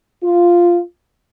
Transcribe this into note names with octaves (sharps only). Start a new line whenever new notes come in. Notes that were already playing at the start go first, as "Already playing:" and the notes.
F4